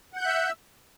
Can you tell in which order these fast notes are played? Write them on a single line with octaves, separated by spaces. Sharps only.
F#5 G6 F#6 E5 E6